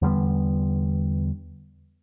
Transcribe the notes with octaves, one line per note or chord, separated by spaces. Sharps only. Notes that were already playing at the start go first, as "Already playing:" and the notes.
E2 D3 G3 B3